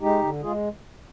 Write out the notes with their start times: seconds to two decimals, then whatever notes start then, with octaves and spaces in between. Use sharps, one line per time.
0.01 G#3 D#4 G4
0.22 D3
0.42 G#3 F4 G#4